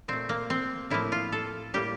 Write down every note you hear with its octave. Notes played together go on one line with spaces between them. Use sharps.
A#2 A3 C4
A#3
C4
A2 F3 A#3 E4
F4
A4
A2 G3 A#3 G4